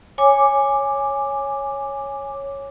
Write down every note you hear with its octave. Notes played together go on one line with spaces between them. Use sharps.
C#5 G#5 D6